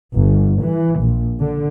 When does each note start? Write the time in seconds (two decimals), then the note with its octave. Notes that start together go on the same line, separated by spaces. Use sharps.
0.16 G1
0.61 E3
1.01 A#1
1.39 D3